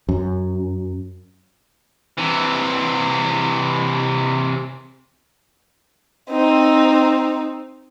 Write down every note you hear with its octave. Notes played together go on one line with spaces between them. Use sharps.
F#2
C3 E3
C4 D#4